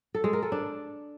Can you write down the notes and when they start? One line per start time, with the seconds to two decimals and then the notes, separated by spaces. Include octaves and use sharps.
0.15 A4
0.24 G#3
0.33 A#4
0.43 A4
0.52 D4